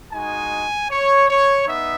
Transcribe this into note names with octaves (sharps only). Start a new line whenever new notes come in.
G#3 D#4 F#4 G#5
C#5
C#5
B3 D#4 E5